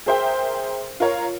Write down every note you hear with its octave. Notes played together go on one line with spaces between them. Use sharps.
G#4 A#4 C5 E5 G5
F4 A#4 C#5